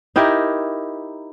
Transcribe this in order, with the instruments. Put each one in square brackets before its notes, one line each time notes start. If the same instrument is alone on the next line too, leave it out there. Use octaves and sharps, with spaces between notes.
[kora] D#4 E4 G4 A#4